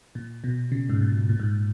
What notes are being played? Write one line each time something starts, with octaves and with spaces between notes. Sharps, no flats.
A#2
B2
C#3
G#2
A#2
A#2
G#2